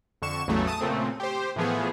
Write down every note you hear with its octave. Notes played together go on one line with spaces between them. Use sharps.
F2 D3 C#6 E7
A1 E2 C#3 E3 F#3 A3
A5 D#6
A#2 C#3 A3 C4
G4 C5
A2 E3 F3 B3 G#4